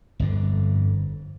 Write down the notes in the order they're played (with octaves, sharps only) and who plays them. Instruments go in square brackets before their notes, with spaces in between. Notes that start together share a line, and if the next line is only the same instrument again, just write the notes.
[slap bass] G1 F2 D3